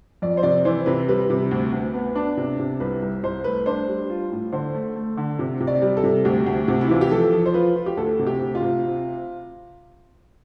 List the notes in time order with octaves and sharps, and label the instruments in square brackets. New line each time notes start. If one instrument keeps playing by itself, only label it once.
[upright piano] F2 [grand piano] D5
[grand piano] C5
[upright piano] C3 [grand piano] D5
[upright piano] E3 [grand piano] C5
[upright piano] C3 [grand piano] B4
[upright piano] G3 [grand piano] B4
[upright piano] C3
D2
D2
B3
D4
C3
C3
[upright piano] C2 [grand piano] B4
[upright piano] C2
[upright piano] C2 [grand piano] C5
[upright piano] A3 [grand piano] B4
[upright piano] D4 [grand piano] C5
[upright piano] G3
F4
A2
[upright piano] D3 [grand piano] C5
[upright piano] A3
A3
D3
C3
C3
[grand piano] D5
[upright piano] G3
[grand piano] A4
[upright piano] C3
[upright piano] D2 [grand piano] G4
[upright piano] D2
C3
[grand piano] E4
[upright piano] E3 [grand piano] F4
[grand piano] G4
[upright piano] F3 [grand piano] A4
[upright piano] F3
[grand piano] C5
[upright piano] F4 [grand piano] B4
[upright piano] F4
[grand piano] G4
[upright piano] D2 [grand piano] A4
[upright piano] C3
[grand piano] G4
[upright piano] D2
[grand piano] F4
[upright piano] C3